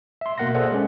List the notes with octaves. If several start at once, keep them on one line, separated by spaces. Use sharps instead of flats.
E5 C6
B2 A#3 A#4 F#5 C6 A#6
G#4 A4 C5 D5 E5 F#5
G#3 C#4